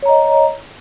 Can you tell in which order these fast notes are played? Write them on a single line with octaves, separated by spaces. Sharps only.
C#5 A#5 D#5